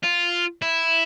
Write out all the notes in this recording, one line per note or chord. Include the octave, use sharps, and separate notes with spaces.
F4
E4